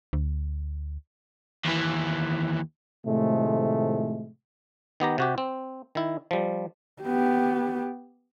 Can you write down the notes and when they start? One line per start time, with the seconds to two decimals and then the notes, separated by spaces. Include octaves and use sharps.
0.13 D2
1.65 D#2 E3
3.06 A2 C3 D#3 F3 G#3 A3
5.00 D#3 B3 G4 A#5
5.18 C3 F#4 G4
5.38 C4
5.95 D#3 E4
6.31 F3 G3
7.03 B3 G4